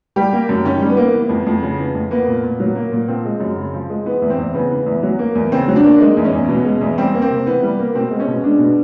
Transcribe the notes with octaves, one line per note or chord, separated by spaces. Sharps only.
G3 G4
A#3
F#2
D#3 C#4
G3
B3
A#3
E3
F2
F2
C#3
E3
F2
A#3 B3
A#2
A#2
F#3
A#3
A#2
F3 C4
G#3
F#2
C#3
F3
G#3
E3 B3
E2
C4
E2
C#3 B3
E3
E2
F#3
A#3
E2
C#3 C4
F#3
D4
A#3
G#3 D#4
E2
C#4
E2
B2
G#3
E2
G3 C4
A#3
C4
C3
E3 B3
G3
A#3
B2 C4
G#3
C#4
B2
G#3 D4
B2